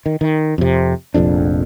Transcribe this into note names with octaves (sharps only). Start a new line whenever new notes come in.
D#3
D#3
F2 C3
F1 A#1 F2 D4